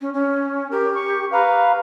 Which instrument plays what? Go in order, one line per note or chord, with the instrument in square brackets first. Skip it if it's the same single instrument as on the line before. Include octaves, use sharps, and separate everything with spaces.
[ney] C#4
C#4
[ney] G4 [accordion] A#4
[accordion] C#6
[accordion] B4 F5 [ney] A#5